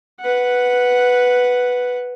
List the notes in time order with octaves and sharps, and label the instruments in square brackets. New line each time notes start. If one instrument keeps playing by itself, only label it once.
[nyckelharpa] B4 F#5